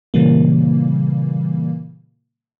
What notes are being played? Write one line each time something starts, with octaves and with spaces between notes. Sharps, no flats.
A#2 C#3 E3 G3 A#3